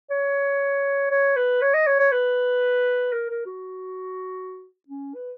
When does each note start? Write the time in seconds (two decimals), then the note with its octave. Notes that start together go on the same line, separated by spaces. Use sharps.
0.10 C#5
1.11 C#5
1.36 B4
1.62 C#5
1.74 D#5
1.87 C#5
1.99 C#5
2.12 B4
3.12 A#4
3.30 A#4
3.46 F#4
4.88 C#4
5.14 B4